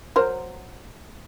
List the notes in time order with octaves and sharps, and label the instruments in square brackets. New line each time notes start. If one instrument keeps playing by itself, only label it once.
[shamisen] F#3 A#4 C5